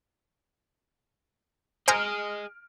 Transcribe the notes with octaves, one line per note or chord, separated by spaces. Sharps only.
G#4 C5 D#5 G#5 A#5 F6 D7